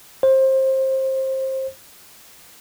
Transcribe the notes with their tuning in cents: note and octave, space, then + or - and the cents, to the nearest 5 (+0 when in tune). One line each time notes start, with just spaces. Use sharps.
C5 +25